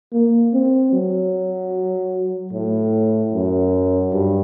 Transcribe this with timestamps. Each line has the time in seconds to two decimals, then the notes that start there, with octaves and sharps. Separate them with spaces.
0.13 A#3
0.54 C4
0.93 F#3
2.53 A2
3.33 F#2
4.13 G2